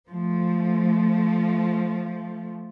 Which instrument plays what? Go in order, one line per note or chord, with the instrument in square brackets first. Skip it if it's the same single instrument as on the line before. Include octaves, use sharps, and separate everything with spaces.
[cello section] F3 A3